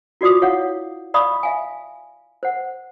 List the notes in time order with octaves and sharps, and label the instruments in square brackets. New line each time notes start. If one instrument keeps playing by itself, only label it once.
[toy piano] F4 F#4 D5 D6 D#6
E4 C#5 F5 F#5
D5 F5 B5 C#6 D#6
E5 F5 G#5
C5 F#5